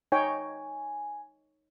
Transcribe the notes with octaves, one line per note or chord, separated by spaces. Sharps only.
D#4 C#5 G5 G#5